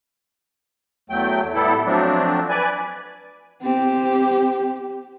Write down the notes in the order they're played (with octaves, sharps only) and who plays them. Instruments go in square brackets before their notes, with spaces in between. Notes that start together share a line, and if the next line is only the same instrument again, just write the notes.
[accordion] E2 F#3 A3 G5
A2 G3 B3 E4 A4
F3 F#3 A3 C4 D4
B4 D5 G#5
[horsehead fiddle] C4 G4